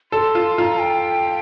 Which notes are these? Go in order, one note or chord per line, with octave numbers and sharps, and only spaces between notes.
A4 C6
F4
F4 A#5
G5